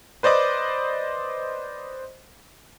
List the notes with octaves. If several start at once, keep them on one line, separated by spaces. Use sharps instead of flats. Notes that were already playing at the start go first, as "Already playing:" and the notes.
B4 C5 D5 D#5 D6